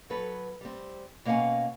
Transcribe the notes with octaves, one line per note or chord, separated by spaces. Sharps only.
F#3 A4 B4
G3 C4
B2 A#3 C#4 F5 F#5 G#5